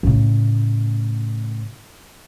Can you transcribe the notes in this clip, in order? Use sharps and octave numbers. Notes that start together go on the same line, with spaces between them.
A2 C#3